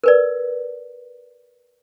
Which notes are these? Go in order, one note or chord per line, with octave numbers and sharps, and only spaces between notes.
A#4 B4 D5